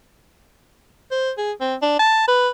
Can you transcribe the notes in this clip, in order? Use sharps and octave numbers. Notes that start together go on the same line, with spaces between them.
C5
G#4
C4
D4
A5
B4